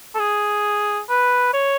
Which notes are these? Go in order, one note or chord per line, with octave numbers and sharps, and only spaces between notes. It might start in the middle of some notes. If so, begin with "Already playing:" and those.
A4
G#4
B4
C#5